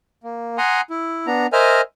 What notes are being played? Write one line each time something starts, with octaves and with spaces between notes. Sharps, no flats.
A#3
F#5 G#5 A#5 C6 D#6
E4
B3 D4 A#5
A#4 C5 D#5 E5 G#5 F6